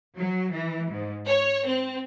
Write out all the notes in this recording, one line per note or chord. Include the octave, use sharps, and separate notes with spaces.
F#3
E3
G#2
C#5
C4